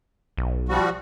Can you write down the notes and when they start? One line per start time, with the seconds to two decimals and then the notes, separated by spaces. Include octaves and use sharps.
0.37 B1
0.69 F3 G3 F#4